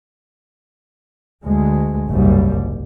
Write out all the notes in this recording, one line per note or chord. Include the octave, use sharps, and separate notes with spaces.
D2 G#3
F#1 C2 G#2 G3